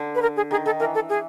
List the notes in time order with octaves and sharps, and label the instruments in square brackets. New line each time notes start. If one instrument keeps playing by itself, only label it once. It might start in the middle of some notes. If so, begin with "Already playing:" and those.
Already playing: [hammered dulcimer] D3
[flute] B4
A#4
G#4
[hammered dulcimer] D#3 [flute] G#4
[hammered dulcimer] D#3 [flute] A4
[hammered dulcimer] E3 [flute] A#4
[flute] A4
G#4